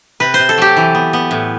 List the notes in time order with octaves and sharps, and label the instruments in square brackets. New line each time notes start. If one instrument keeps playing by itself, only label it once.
[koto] C3 B4
C5
C3
A4
F#3 G4
E3
B3
B3
A2